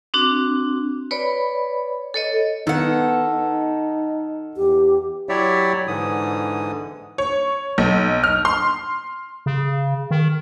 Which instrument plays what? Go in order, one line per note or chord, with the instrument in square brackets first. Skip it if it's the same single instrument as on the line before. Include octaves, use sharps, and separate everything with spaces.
[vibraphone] C4 D4 F#4
B4 C#5 D5 B5
A4 C#5 D#5
[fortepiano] D#3 [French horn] B3 [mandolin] A4 F#5
[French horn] D#4
[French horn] E2 [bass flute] G4
[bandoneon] F#3 E4 G4 C#5 D5 E5
G#2 D3 E3 D#6
[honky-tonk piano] C#5
B1
F6
C6
[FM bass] C#3
D#3